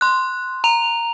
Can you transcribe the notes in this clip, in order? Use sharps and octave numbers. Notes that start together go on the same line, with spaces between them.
C6 F#6
A#5 F7